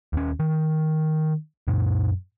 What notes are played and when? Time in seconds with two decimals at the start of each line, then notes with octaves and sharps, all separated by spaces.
0.13 D#2 C#4
0.40 D#3
1.68 F#2 A#2